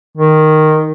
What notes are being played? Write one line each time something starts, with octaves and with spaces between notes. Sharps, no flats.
D#3